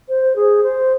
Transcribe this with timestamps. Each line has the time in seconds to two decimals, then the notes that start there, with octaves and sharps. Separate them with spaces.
0.08 C5
0.36 G#4
0.63 C5